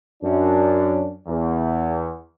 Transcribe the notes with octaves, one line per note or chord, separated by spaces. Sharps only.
F#2 D4
E2